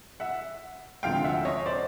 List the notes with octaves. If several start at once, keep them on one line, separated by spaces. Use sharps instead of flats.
E5 F#5
D2 C3 F3 G#3 F5 G5
E5 F#5
C#5 D#5
C5 D5